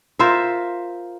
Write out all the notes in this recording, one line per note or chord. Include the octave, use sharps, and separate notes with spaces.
F4 A#4 C5 E5